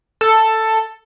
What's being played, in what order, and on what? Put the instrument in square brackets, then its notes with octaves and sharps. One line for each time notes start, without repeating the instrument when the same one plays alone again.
[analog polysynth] A4